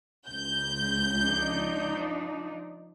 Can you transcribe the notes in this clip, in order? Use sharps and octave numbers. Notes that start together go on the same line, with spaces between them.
C#2 G6
F3 D4 D#4